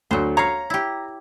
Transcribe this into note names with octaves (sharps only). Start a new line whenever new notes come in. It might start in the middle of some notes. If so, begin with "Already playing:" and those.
D2 F#3 C5
C#5 F5 A#5
E4 G4